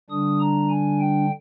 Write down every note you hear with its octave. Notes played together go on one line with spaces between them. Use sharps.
D3 G3 D4 D#6
A#5
G#5
G5